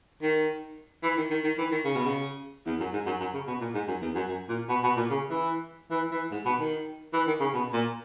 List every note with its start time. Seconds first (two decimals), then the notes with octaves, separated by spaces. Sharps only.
0.22 D#3
1.03 E3
1.17 D#3
1.31 D#3
1.44 D#3
1.58 E3
1.71 D#3
1.85 C#3
1.96 B2
2.06 C#3
2.66 E2
2.80 F#2
2.93 G#2
3.06 F#2
3.20 F#2
3.34 C#3
3.47 B2
3.61 A#2
3.74 G#2
3.88 F#2
4.02 E2
4.15 F#2
4.28 F#2
4.49 A#2
4.69 B2
4.83 B2
4.97 A#2
5.10 C#3
5.30 E3
5.91 E3
6.12 E3
6.32 G#2
6.45 B2
6.59 D#3
7.13 E3
7.27 D#3
7.40 C#3
7.54 B2
7.73 A#2